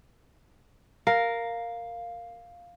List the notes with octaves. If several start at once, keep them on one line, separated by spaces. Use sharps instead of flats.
A#4 F5